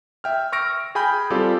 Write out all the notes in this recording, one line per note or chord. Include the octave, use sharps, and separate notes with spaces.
E5 G5 F6
C#6 E6 F6 A#6 D7
G#4 G5 G#5 B5 F6 G6
G3 C4 F4 G4 A4 D5